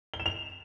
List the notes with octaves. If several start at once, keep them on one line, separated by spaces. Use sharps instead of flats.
G7
E7
F7